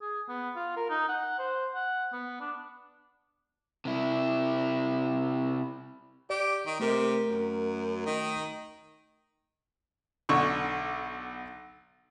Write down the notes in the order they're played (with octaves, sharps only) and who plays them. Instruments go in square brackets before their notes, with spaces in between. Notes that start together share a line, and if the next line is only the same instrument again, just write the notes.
[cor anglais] G#4
B3
F4
A#4
D#4
F#5
C5
F#5
B3
D4
[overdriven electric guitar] C3 E4
[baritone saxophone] G4 [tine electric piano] D5
[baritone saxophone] D#3
[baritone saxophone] C3 [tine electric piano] A3 A#4
[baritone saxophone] F#2
D#3
[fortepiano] B1 D3 C#6